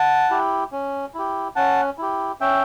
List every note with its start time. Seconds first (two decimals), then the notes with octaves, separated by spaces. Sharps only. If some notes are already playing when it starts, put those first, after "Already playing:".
Already playing: F#5 A5
0.30 E4 G4
0.72 C#4
1.14 E4 G4
1.56 C#4 F#5 A5
1.98 E4 G4
2.41 C#4 E5 G5